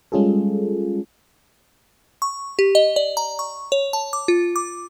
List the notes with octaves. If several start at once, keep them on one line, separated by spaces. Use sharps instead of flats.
G3 G#3 C#4 F4 G#4 A4
C#6
G4
D#5
D5
A#5
C#6
C#5
A5
D6
F4
D6